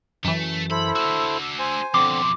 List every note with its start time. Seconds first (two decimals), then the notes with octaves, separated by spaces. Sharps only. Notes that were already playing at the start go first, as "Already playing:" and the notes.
0.24 F#2 E3 A3
0.70 E4 A4 C5 B5
0.95 D4 F#4 E6
1.59 C5 G#5
1.94 F2 B2 D3 C4 C6 D6